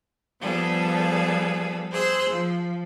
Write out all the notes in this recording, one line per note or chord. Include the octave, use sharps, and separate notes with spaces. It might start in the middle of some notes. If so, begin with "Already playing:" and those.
F3 G3 B3 G#4 A4
G#4 C5 C6 E6 F#6
F3